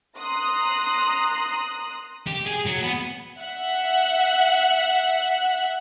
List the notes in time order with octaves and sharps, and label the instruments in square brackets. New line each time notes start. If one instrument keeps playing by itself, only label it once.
[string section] A#5 C6 D#6 F#6
[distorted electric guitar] G4
G#4
F#3
B3
[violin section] E5 F#5